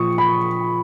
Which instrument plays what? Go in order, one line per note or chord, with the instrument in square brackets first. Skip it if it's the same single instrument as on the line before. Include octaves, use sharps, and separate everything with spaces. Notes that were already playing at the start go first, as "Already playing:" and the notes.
Already playing: [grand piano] A#2 F3 C#6 D#6
B5